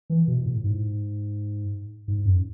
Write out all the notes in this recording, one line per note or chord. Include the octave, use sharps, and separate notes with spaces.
E3
B2
A2
G#2
G#2
F#2